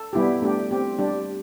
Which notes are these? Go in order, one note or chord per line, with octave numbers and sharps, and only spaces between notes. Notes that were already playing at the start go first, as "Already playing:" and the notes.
Already playing: A4
G3 B3 E4 G4
A3 D4 G4
C4 G4
G3 D4 G4